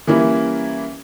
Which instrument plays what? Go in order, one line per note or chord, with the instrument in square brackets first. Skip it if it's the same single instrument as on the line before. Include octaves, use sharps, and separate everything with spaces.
[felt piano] E3 G3 A#3 C#4 E4